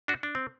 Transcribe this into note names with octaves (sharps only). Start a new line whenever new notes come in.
D4 F#4
D4
C4